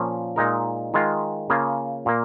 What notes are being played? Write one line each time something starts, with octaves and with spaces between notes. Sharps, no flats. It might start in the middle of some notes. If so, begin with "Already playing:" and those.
Already playing: A#2 F3 A#3 C#4
A#2 G#3 D#4 A#4
D#3 G#3 F4
C#3 A#3 F4 G#4
A#2 A#3